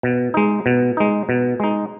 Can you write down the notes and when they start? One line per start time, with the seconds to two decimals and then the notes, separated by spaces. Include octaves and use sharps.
0.03 B2
0.34 G#3 D#4
0.66 B2
0.97 G#3 D#4
1.29 B2
1.60 G#3 D#4